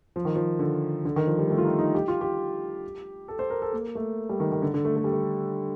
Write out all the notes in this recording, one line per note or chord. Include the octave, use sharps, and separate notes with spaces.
F3
D#3
F3
D3
D3
D#3
F3
G3
A3
F4
D#4
D#4
G4
F4
G4
A4
C5
A#4
A4
A#3
A3
G3
D#3
D#3
D3
D3
A3
A3
G3
A3